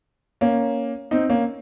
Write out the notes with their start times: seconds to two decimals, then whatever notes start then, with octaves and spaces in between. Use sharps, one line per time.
0.41 A#3 C#4
1.11 C4 D#4
1.30 A#3 C#4